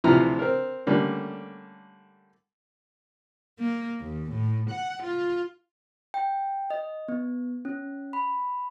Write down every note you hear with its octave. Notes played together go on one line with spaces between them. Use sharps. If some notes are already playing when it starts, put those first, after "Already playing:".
D2 C3 E3 F3 A#5 F6
C4 A#4
D3 G3 A3 A#3 C#4
A#3
D#2
A2
F#5
F4
G5
D#5
B3
C#4
B5